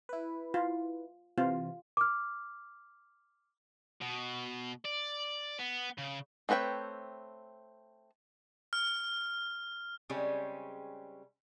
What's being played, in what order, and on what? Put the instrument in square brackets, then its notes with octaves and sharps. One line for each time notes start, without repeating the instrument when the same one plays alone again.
[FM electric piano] E4 B4
[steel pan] F4
[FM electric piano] C3 E3 [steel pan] F4
[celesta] D6 F6
[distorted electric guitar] B2
D5
B3
C#3
[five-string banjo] A3 C4 B4 C#5 G5
[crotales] F6
[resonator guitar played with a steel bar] C#3 G3 G#3 C4 C#4